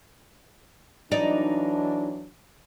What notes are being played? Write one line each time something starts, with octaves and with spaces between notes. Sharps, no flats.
E3 F#3 D4 D#4 D5